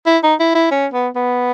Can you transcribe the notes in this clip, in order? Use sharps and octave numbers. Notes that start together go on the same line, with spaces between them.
E4
D#4
E4
E4
C#4
B3
B3